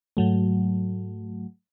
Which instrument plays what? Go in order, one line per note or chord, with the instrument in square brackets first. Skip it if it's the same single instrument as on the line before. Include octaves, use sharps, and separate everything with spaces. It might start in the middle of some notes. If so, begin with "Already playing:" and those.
[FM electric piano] G#2 F#3 A3